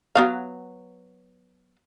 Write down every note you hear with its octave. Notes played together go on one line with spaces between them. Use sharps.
F#3 B3 F5